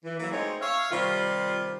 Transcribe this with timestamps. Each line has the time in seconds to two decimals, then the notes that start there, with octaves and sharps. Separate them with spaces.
0.05 E3
0.20 E3 F#3 A#3 E4
0.32 G#3 A3 C4 D#4 C#5
0.61 C#5 E5 F5
0.91 C3 D#3 G3 F4